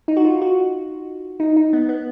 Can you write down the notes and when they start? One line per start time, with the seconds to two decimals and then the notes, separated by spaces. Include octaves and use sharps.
0.08 D#4
0.17 F#4
0.25 F4
0.42 F#4
1.40 D#4
1.57 D#4
1.73 B3
1.89 B3